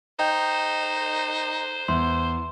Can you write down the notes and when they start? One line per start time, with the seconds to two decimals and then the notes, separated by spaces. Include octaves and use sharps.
0.19 D#4 C5 D#5 G5 G6
1.88 E2 C6